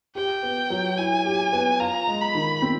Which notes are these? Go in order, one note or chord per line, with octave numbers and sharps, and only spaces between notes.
G4 G5
B3
F#3
E4 G#5
G4
B3
F4 A#5
G#3
B5
D#3
C4